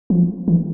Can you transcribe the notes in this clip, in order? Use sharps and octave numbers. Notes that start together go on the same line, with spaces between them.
F3
E3